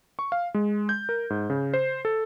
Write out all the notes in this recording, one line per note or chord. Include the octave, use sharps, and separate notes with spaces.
C#6
F5
G#3
G6
A#4
G#2
C#3
C5
A4